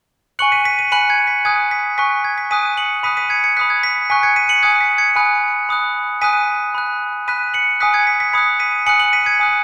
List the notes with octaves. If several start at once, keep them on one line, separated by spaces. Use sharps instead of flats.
G#5 C#6 F#6 C#7 F#7
B6 D#7
B6 D#7
B6 D#7
G#5 B5 F#6 C#7 F#7
G#6 C#7
B6
G#5 D#6 F#6 G#6
B6
G#5 C#6 F#6 B6
G#6
B6
G#5 D#6 F#6 B6 D#7
C#7 F#7
B5 D#6 F#6 B6 D#7
B6 D#7
G#6 C#7
G#6 C#7
B5 D#6 F#6 B6
G#6
B6
G#5 C#6 F#6 B6
G#6 C#7
B6 D#7
C#7 F#7
G#5 D#6 F#6 G#6 C#7
B6
G#6 C#7
G#5 B5 D#6 F#6
B5 D#6 F#6
G#5 D#6 F#6 B6 D#7
B5 F#6
B5 F#6 B6 D#7
C#7 F#7
G#5 D#6 F#6 B6
G#6 C#7
B6
B6
B5 D#6 F#6 G#6 C#7
B6 D#7
G#5 D#6 F#6 C#7 F#7
C#7 F#7
B6 D#7
G#6 C#7
G#5 D#6 F#6